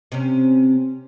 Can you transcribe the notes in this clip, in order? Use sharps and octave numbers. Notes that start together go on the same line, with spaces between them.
C3 C#4